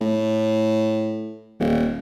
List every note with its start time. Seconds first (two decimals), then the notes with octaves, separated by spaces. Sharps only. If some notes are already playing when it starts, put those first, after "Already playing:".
0.01 A2
1.60 D#1